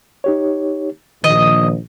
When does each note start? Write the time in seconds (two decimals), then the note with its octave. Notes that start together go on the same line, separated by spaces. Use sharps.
0.24 D#4 G4 C#5
1.24 A#1 D#3 D#5